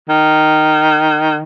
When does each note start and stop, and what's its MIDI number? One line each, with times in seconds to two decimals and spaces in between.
0.09 1.41 51